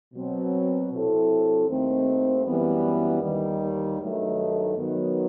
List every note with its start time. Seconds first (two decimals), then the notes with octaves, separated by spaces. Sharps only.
0.14 B2 F#3 C4
0.91 C3 F#3 C4 E4 A4
1.68 D#2 D#3 A3 C4
2.45 F#2 E3 G3 B3
3.22 D#2 D#3 G3
4.00 G2 D#3 F#3 A3 D#4
4.76 D#3 F#3 B3